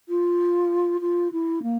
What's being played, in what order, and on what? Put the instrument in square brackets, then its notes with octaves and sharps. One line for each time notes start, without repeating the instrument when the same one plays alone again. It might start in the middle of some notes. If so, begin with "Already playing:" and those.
[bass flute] F4
F4
E4
A#3